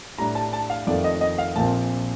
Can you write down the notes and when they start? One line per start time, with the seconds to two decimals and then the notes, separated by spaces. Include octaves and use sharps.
0.18 A2 G3 D4 A#5
0.35 A5
0.53 A5
0.70 F5
0.87 F2 D#3 A3 D5
1.04 D#5
1.21 D#5
1.38 F5
1.56 A#1 A#2 F3 C4 A5